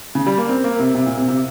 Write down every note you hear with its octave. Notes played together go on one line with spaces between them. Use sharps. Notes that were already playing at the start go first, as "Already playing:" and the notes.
C#3
G3
A#3
C4
A#3
C3
C3
A#2
C3
C3